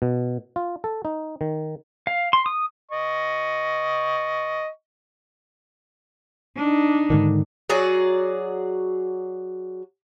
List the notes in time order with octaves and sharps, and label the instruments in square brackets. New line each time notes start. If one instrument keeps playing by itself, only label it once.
[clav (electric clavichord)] B2
F4
A4
D#4
D#3
[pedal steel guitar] F5
C6
D#6
[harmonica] D#5 C#6
[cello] D4 D#4
[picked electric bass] G#2 D3 D#3
[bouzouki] F#3 F#4 G#4 D5